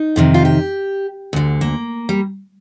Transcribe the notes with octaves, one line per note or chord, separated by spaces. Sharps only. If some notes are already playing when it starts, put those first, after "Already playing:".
Already playing: D#4
F2 C3 D#3
F4
G4
D2 D3
A#3
G3